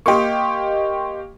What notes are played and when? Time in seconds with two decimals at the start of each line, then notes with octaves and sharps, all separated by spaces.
0.06 A#3 G4 D#5 C6 C#6